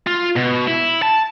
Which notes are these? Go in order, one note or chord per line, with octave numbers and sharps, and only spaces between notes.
F4
B2
E4
A5